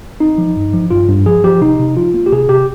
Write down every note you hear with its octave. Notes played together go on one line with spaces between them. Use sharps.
C4 D#4
F3
G2
F3
G2 F4
G2
F3 G#4
F3 G4
C3 D#4
C3
F3 F4
A#3
G4
C3 G#4
C3 G4